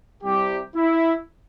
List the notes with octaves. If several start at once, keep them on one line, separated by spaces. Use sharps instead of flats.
C2 C3 G3 G4
E4